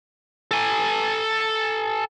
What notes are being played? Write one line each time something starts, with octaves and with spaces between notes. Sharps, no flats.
A4 G#5